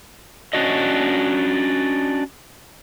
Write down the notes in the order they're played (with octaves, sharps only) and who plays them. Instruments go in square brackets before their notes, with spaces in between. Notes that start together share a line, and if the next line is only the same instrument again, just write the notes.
[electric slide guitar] C#4 D4 F#4 D#5